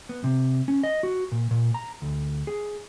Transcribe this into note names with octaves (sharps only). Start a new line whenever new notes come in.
B3
C3
C#4
D#5
F#4
A#2
A#2
A#5
D2
G#4